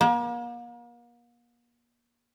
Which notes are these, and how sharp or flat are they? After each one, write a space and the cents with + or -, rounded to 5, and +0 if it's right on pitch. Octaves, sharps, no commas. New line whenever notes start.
A#3 +40